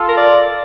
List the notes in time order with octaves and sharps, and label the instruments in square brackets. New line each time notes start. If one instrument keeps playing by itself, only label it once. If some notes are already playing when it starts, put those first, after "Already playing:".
Already playing: [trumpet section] F4 A4
[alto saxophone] A#4
D5